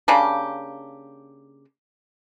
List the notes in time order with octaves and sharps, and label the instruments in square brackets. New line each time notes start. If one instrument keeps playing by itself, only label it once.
[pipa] C#3 A#3 D4 G4